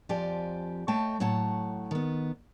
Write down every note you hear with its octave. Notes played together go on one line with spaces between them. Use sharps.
F2 F3 G4 D5 G#5
A3 C#5 D#5 G5 A5
A2 F#3 C#5 F#5 A5
D#3 B3